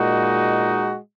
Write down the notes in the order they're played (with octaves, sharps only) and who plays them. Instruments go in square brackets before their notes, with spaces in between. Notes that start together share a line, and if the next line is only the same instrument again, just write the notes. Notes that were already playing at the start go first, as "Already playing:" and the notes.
Already playing: [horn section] A#2 G#3 D#4 F#4